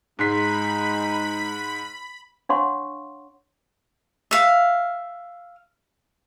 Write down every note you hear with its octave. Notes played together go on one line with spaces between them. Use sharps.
G#2 G#3 D#4 B5 C6 B6
D4 C#5 F5 F#5 C6 C#6
E5 F5